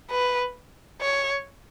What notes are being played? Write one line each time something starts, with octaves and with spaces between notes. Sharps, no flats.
B4
C#5